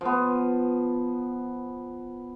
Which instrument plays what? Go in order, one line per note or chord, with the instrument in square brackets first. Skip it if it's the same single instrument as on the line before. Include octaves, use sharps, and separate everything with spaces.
[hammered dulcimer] F3 B3